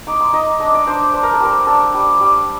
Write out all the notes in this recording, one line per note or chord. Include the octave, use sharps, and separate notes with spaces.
D#4 D6
C6
D#4 D#5
D4 D#5
D5
D4 C5
D4 C5
A#4
A4
G3 A#4
D4 A4
G3
G3